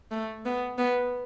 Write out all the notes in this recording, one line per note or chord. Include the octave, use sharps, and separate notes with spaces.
A3
B3
B3